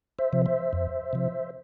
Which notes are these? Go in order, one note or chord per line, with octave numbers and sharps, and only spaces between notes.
C5 E5
C3 F3
C5 E5
F2
C3 F3